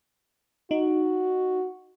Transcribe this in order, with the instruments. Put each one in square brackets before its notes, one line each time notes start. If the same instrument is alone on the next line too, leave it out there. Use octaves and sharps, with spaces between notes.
[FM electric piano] D#4 [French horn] F#4